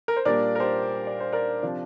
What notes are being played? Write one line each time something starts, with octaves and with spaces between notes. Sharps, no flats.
A#4
C5
A#2 G3 A#3 D4 A#4 D5
A#4
G4 C5
D5
C5
A#4 D5
C3 F3 D4